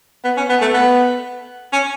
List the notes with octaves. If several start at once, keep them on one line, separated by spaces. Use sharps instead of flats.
B3
C#4
B3
A3
B3
C#4